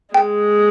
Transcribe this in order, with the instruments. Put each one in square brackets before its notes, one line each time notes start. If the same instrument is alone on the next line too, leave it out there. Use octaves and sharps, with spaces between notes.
[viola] G#3 [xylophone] G5